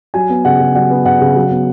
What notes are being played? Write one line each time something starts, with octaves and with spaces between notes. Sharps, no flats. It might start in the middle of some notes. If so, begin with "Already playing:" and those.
F#3 G#5
B3
C#3 F#5
C#3
F#3 F#5
B3
C#3 F#5
C#3
F#3
B3